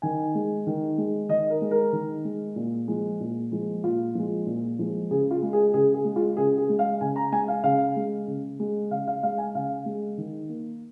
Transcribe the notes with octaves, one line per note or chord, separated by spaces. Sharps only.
D#3 G#5
G#3
D#3
G#3
D#3 D#5
A#4
G#3
A#4
D#3
G#3
A#2
F3 G#3
A#2
F3 G#3
A#2 F4
F3 G#3
A#2
F3 G#3
C#3 G#4
F4
G#3
G#4
C#3 G#4
G#4
G#3
F4
C#3 G#4
G#4
G#3
F5
C#3 G#5
A#5
G#3 G#5
F5
C#3 F5
G#3
C#3
G#3
C#3 F5
F5
G#3 F5
G#5
C#3 F5
G#3
D#3
A#3